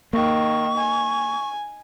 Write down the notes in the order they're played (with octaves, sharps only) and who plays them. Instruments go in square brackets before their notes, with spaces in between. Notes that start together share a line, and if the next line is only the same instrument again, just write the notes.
[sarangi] D#3 [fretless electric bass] A#3 [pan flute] C#6
[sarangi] G#5